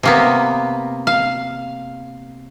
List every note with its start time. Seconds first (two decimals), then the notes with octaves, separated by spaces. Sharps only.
0.03 C3 A#3 B3
1.07 F5